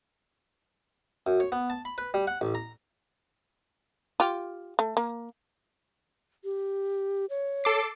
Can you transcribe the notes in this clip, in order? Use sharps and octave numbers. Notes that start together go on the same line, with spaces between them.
F#2
C#5
B3
A5
B5
B4
G3
F#5
A1
A#5
F4 G4
A3
A#3
G4
C#5
A4 D6 C7